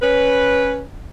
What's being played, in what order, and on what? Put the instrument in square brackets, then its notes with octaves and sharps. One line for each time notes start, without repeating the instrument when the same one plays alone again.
[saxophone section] C#4 B4